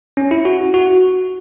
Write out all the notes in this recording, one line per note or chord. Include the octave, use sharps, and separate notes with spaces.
C#4
E4
F#4
F#4